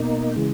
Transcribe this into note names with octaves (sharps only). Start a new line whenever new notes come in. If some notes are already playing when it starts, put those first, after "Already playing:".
Already playing: B2 A#3 D#4
C#3 E3 G#3